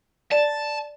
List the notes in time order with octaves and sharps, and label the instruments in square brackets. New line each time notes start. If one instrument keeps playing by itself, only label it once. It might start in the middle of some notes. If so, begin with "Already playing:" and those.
[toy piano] D5 [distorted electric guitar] A5